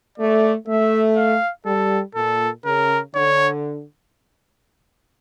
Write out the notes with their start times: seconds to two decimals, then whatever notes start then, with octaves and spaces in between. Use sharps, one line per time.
0.18 A3 D5
0.67 A3 E5
1.17 F5
1.66 G3 A4
2.15 A#2 A4
2.65 C#3 A#4
3.15 D3 C#5